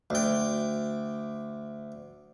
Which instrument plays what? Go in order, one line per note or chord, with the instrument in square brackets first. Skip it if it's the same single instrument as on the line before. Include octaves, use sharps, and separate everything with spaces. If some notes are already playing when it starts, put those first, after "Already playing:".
[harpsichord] D2 G5